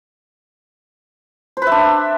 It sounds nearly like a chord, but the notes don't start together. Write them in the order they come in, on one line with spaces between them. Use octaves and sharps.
C5 B4 E5 D4